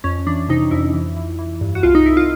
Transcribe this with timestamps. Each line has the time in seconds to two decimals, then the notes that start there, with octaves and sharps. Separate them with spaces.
0.04 F2 C#4
0.27 E3 D4
0.49 C3 D#4
0.71 F2 E4
0.94 E3
1.17 E3
1.39 E3
1.61 G2
1.75 F#4
1.83 C2 F4
1.95 D#4
2.06 C2 E4
2.17 F4